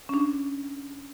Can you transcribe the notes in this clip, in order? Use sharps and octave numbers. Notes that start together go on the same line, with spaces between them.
C#4 D4